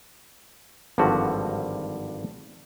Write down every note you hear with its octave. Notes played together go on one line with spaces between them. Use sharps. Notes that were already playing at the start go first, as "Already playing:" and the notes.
G#1 G2 D3 F3 F#4